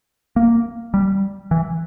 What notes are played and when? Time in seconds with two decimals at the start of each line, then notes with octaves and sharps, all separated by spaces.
0.36 A#3
0.94 G3
1.51 E3